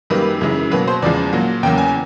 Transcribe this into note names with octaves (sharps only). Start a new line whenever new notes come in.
F#2 D#3 G3 A#3 B4
F#2 C#3 E3 G#3
B2 F#3 A#3 B4
C5
E2 C#3 F3 G#3 D5
A#2 F#3 A#3
E2 C#3 F#3 A#3 G5
G#5